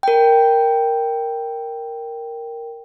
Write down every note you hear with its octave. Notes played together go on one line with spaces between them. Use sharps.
A#4 G5